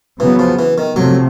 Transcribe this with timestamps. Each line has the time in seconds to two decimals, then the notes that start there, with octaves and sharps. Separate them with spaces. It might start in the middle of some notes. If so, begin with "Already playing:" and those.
0.20 C#3 E3 F#3 B3
0.39 F3
0.59 E3
0.78 D#3
0.96 C3 F3 F#3 A3